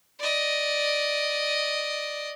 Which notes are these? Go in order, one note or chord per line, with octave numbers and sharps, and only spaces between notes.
D5 D#5